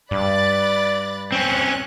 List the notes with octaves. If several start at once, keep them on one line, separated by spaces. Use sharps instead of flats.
G2 D5 B5 F#6 A6
C4 C#4 F#6